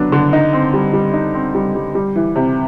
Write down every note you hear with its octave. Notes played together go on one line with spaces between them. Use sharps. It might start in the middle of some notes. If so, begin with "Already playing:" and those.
Already playing: D3 F#3 B3 D4
D3
D#4
C4
G3
G3
D#4
C4
G3
G3
G3
E3
C3